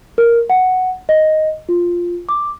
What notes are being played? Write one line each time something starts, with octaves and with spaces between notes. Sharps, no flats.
A#4
F#5
D#5
F4
D6